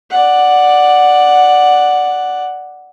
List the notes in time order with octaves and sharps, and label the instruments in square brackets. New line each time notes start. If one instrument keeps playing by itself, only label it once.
[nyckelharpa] D5 F#5